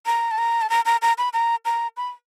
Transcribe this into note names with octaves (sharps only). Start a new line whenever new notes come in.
A#5
A5
A#5
A5
A#5
A#5
A#5
B5
A#5
A#5
B5